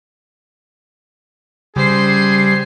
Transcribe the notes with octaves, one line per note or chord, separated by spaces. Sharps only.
C#3 G3 G#4 C5 C7